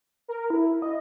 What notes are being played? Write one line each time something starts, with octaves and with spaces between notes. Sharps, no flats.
A#4
E4
D#5